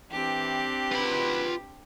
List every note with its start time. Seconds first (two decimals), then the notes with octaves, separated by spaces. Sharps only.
0.11 E3 C4 D4 G4
0.92 D#3 F4 F#4 B4 B5